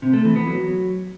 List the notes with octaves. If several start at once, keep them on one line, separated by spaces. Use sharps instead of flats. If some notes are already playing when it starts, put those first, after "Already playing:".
C3
A3
E3
B3
F#3